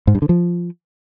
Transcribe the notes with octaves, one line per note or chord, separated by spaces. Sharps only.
G#2
G2
D3
F3